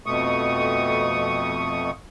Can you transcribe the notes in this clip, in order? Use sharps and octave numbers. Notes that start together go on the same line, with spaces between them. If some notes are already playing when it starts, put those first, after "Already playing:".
F2 B2 A3 C#6 D#6